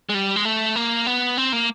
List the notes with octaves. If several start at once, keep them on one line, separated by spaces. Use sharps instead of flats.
G#3
G3
G#3
A3
A#3
B3
C4
A#3